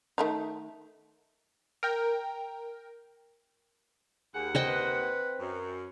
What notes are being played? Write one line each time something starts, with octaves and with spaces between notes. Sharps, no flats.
D#3 A3 D#4
A#4 G5
D#2 G#4 F#5
C4 C5 D#5 G5
B4
F#2